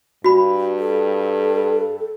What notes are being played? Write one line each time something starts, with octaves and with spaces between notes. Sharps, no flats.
G2 F#4 B5
A4